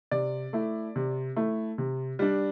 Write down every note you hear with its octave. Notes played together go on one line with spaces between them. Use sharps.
C3 D5
A3 E4
C3
A3 E4
C3
G3 D4